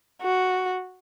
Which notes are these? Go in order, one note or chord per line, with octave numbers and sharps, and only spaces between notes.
F#4